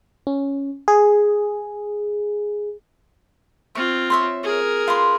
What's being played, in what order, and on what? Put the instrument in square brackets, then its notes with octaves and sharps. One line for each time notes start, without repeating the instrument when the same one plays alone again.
[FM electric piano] C#4
G#4
[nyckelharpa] C4 F4 [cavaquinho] C#6
[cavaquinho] C#5 E5 C6
[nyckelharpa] G#4 A#4
[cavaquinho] F4 B4 C6